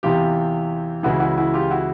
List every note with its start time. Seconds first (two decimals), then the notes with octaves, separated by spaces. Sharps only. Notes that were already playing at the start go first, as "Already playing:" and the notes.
0.03 E2 C3 E3 F4 G4
1.03 C#2 C#3 E3 E4 F#4
1.20 E4 F#4
1.38 E4 F#4
1.54 F4 G4
1.71 E4 F#4